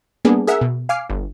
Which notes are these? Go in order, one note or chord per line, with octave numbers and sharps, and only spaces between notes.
G3 A#3 B3 D4 G#4
G#4 A#4 E5 F#5 E6
B2
F5 G#5 D6 F6 C7
G1